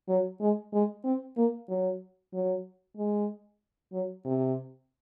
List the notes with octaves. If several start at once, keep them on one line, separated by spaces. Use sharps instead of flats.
F#3
G#3
G#3
C4
A#3
F#3
F#3
G#3
F#3
C3